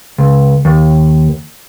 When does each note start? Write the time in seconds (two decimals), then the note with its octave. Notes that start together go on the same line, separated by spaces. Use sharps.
0.19 C#2
0.65 D#2